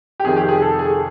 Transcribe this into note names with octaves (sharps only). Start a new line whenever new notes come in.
G4
F2 C3 D#3 G#4
G4
G#4
A4
G#4